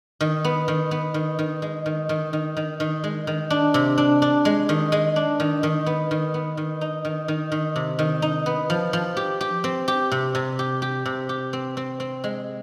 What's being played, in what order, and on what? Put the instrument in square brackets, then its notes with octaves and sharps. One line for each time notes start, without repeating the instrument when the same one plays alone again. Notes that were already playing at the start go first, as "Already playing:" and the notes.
[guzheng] D#3
B3
D#3
B3
D#3
D#3
G#3
D#3
D#3
D#3
D#3
D#3
G#3
D#3
D4
C3
D4
D4
G#3
D#3
G#3
D4
D#3
D#3
B3
D#3
B3
D#3
D#4
D#3
D#3
D#3
C3
D#3
D#4
B3
F3
F3
G4
G4
C4
G4
C3
C3
G4
G4
C3
G4
C4
C4
C4
G#3